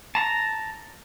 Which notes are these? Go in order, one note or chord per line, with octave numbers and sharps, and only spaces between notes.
A5 A#5